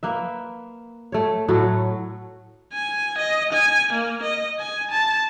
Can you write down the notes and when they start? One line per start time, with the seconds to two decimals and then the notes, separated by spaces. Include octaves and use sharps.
0.03 A#3 B4 E5
1.12 A3 C#5
1.48 A2 F#3 A3 F#4
2.74 G#5
3.18 D#5
3.53 G#5
3.93 A#3
4.23 D#5
4.59 G#5
4.91 A5